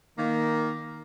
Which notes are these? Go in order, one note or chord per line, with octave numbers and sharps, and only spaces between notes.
D#3 A#3